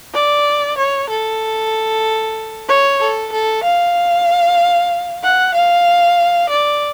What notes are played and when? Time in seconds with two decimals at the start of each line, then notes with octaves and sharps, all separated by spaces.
0.14 D5
0.78 C#5
1.09 A4
2.69 C#5
3.01 A4
3.32 A4
3.64 F5
5.23 F#5
5.54 F5
6.50 D5